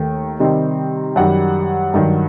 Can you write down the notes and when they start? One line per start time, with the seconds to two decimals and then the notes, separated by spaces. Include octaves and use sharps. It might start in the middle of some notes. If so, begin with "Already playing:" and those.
Already playing: D#2 D#3 A3 G5
0.40 C3 D#3 G3 C4 D#4
1.16 F#2 D#3 G3 F#5
1.94 G2 D#3 F#3